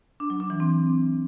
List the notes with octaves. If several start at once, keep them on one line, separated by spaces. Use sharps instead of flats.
D4
F#3
D4
E3
C4